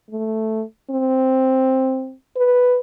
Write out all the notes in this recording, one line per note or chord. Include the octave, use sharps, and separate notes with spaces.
A3
C4
B4